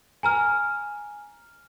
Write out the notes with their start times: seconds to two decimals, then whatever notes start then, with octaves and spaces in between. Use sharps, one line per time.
0.23 G#5 A#5 F6